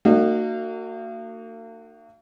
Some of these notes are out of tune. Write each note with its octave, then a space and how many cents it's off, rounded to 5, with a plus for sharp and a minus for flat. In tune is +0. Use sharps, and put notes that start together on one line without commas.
A#3 -45 D#4 -35 F#4 +0